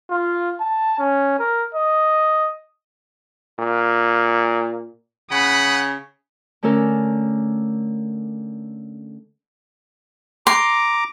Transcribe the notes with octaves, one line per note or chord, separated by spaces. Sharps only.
F4
A5
C#4
A#4
D#5
A#2
C#3 F#5 B5 D#6
D3 A3 C#4 A4 A#4
A#5 C6 D6